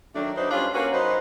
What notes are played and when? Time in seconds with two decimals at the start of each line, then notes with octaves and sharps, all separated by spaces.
0.15 D#3 F#3 A3 D4
0.36 F#3 D4 D#4 B4 C5
0.51 G3 C#4 D4 F4
0.74 A#3 C#4 D4 F#4 B4
0.93 F#3 D#4 B4 C5